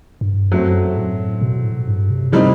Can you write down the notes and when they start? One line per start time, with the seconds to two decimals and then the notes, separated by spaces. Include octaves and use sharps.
0.21 G2
0.51 F#2 F#3 A3 C4
0.97 A2
1.42 B2
1.64 A2
1.87 G2
2.10 C3
2.32 A2 C3 G3 C4 D#4